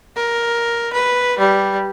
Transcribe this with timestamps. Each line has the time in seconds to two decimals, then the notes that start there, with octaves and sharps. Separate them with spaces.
0.17 A#4
0.93 B4
1.39 G3